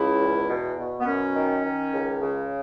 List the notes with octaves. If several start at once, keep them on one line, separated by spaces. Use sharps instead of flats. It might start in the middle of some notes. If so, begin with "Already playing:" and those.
Already playing: C#2 C#3 E4
E2
B2
B2
B3
F#2 C#4
D#3
D#3
C#2
C#3